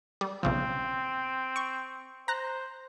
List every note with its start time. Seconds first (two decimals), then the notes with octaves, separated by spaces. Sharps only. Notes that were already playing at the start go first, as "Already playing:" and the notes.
0.21 G3
0.43 B1 C#3 F3 C4
1.56 C#6
2.28 C5 A#5 F#6